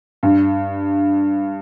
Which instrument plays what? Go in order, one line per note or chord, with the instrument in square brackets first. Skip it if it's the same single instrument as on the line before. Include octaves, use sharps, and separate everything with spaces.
[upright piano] G2